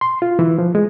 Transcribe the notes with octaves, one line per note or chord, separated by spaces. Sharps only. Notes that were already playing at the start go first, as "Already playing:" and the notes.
C6
F4
E3
F3
G#3